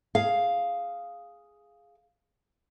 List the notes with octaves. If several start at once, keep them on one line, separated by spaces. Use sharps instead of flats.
G#4 F5